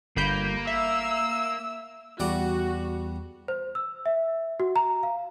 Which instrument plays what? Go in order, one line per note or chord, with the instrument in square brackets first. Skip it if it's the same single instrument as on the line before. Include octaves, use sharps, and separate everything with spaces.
[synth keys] G1 B5 G6 [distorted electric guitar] A#3
[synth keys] E5 [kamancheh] E6
[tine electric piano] E2 [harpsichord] G3 D5 F#5 [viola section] F#4
[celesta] C5
E6
E5
F#4
A#5
F5